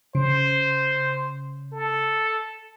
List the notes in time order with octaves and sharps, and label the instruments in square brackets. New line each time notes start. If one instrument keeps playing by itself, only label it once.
[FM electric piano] C#3 [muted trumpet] C5
[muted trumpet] A4